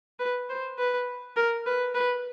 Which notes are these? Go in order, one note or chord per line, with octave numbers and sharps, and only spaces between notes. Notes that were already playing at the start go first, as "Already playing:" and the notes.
B4
C5
B4
A#4
B4
B4